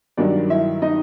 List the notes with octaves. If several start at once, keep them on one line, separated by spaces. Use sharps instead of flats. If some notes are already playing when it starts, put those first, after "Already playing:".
G2 D#3 F#3 D4 D5
E4 E5
D#4 D#5